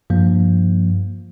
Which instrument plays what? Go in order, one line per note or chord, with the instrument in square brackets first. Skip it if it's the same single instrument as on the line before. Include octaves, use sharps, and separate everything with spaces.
[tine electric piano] G2 F3 A#3